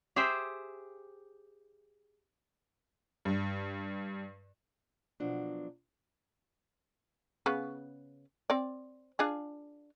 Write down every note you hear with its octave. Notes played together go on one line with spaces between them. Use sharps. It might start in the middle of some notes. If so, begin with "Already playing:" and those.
G4 G#4 C5 E5 G5
G2
B2 F3 F#3 D4
C#3 B3
C4 D5
D4 F4 G#4